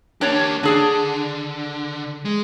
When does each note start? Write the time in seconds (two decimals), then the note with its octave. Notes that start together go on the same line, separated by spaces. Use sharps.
0.21 A#3 D4 G4 C#5 A5
0.63 D3 D4 G#4 A5
2.25 G#3